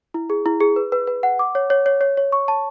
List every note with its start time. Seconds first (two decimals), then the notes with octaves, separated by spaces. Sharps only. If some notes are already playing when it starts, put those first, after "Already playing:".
0.14 E4
0.30 G#4
0.46 E4
0.60 G#4
0.76 B4
0.92 B4
1.07 B4
1.23 F#5
1.39 D6
1.55 C#5
1.70 C#5
1.86 C#5
2.01 C#5
2.17 C#5
2.32 C#6
2.48 A5